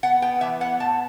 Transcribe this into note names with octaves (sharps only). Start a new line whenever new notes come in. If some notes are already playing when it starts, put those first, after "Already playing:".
B3 F#5
B3 G5
E3 E5
B3 F#5
A2 A5